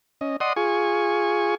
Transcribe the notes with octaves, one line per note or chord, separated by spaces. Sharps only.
C#4 D#5
D5 D#5 F#5 C6 D#6
F4 G#4 G#5 C#6